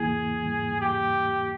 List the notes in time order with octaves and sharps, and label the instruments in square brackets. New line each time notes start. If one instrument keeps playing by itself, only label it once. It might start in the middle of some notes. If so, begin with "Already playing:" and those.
Already playing: [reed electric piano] E2 E3 A#3 E4 [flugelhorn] G#4
[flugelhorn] G4